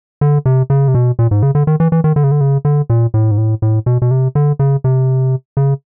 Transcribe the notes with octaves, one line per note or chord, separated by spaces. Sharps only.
D3
C3
C#3
C3
B2
A#2
G#2
C#3
D3
D#3
E3
E3
D#3
D3
C#3
D3
C#3
D3
A#2
A2
G#2
A2
A2
B2
B2
C3
D3
C#3
C3
C#3